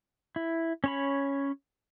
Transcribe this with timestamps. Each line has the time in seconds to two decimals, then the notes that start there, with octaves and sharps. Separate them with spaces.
0.36 E4
0.84 C#4 C#5 B5